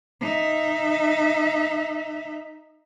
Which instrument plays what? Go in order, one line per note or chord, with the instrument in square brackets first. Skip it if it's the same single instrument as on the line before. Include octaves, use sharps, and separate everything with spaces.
[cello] D#4 E5